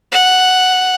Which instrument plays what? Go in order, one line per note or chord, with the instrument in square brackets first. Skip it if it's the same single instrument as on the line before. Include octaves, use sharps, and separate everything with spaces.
[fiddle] F#5